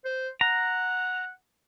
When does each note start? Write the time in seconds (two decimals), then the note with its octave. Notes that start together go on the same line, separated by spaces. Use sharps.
0.05 C5
0.41 F#5 A#5